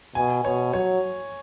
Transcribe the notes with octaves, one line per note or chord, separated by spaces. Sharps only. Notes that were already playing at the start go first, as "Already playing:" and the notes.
B2 G#5
B2 C#5
F#3 C#5